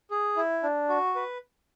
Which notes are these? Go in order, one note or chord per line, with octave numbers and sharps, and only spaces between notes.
G#4
E4
D4
F#4
B4